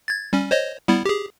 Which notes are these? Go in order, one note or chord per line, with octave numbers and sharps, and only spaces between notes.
G#6 A6
G3 C#4
C5 C#5 D#5
G3 B3 E4
G4 G#4